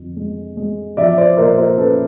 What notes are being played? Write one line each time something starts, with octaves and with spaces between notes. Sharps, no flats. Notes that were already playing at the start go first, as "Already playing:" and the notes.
Already playing: F2 D3
G#3
G#3
F3 D5 E5
C5 D5
A#2 A#4 C5
A#4 C5
C#4 A4 B4